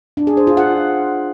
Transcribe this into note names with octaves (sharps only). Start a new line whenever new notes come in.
D4
G#4
C5
F4
F#5